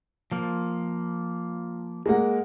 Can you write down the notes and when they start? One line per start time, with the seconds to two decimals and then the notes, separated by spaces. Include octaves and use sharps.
0.32 F3 A#3
2.06 G#3 A#3 F#5